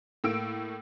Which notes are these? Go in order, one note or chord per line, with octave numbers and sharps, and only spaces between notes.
A2 A3 A#3 E6 D7